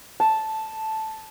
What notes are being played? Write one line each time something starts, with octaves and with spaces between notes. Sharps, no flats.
A5